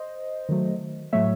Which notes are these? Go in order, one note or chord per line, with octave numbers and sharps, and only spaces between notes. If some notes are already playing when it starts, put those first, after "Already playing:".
Already playing: C5 D#5
D#3 F#3 A3
A2 F#3 A3 C#5 E5